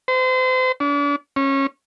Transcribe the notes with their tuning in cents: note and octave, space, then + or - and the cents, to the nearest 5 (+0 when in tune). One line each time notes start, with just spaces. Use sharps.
C5 -35
D4 -40
C#4 -20